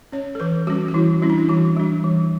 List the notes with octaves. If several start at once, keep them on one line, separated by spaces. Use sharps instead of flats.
C#4 C#5
A4
E3 B4
G3 C#4 F#4
F#4
E3 E4
G3 C#4 E4
D4
E4
E3 F#4
G3 D4
E3